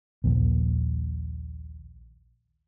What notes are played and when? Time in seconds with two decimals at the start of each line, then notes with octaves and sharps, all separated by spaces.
0.24 A#1 D#2